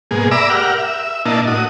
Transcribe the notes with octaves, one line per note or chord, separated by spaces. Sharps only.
G#2 B2 A#3 G#4
D5 E5 A#5 B5 D6 E6
G4 A#4 F#5 F6
E5
A#2 A#3 D4 E4 D#5 A5
A2 F#4 D#6